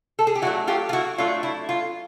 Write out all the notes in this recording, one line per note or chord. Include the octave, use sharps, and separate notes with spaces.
A4
G#4
G4
F#3 A3 D4 E4 F#4
F4 G4
F4
E4 F#4
F#3 A3 D4 F4
E4
F4